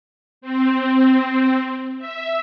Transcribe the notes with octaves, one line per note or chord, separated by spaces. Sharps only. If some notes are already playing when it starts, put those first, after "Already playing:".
C4
E5